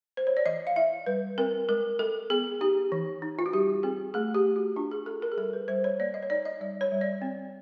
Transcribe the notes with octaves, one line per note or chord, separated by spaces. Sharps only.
C5
C#5
D5
E3 D#5
F5
E4 E5
G3 B4
C4 A#4
G#3 A#4
G#3 A4
B3 G#4
D#4 G4
E3
D#4
F4
F#4
G3 G4
C4 G#4
A3 G#4
G4
A3
F#4
D4 F4
G#4
F4 A4
A#4
G#4
G3 A4
B4
G3 C5
C#5
A#3 D5
D#5
C#5
D#4 D5
D#5
G3 D5
C#5
G3
D5
C4